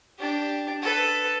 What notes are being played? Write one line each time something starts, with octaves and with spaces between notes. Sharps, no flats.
D4 G4
A4 B4